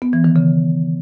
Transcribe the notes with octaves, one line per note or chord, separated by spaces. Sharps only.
B3
E3
D#3
C#3